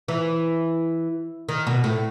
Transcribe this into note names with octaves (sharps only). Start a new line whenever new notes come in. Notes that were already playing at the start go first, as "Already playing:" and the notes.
E3
D#3
B2
A2